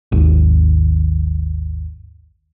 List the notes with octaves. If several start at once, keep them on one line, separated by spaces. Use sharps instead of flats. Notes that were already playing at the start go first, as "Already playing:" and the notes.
G#1 D#2